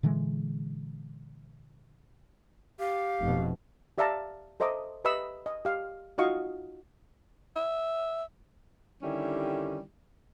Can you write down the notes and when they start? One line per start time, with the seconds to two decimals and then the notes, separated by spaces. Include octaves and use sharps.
0.03 A#2 D3 E3 G#3
2.79 G4 F5
3.21 F1 B2
3.98 G4 D5 E5 F5 A5 A#5
4.60 A4 C5 D#5 E5 A#5 D6
5.05 G4 B4 D#5 E5 B5 E6
5.46 D#5
5.65 G4 F5
6.18 D#4 F4 F#4 D#5 F5 C#6
7.56 E5
9.02 D3 D#3 G3 C#4 E4 G4